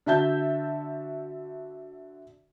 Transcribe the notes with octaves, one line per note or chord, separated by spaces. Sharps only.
D3 F#4 E5 A5 G6